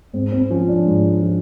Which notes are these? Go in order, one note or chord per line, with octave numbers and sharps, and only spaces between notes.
G#2 C4
C4
F3 C#4
D4
G#2
F3